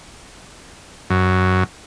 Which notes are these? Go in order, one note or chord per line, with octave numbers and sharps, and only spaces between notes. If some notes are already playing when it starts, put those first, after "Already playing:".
F#2